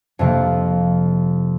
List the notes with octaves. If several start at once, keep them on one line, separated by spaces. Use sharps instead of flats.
F2 C3 F3 A#3